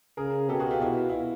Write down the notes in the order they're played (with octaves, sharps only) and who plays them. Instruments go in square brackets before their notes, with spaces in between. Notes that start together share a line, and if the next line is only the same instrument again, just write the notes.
[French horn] C#3 [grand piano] G#4 A#4
[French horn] B2 [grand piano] G4 A4
[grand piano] F#4 G#4
F4 G4
[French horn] B2 [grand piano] E4 F#4
[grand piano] F4
E4